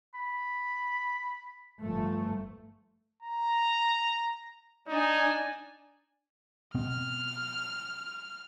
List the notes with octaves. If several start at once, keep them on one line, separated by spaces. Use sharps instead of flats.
B5
G1 F3 A3
A#5
D4 D#4 G#5
B2 B3 C4 F6